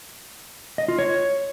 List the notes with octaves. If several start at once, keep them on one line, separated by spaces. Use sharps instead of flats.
D#5
F4
C#5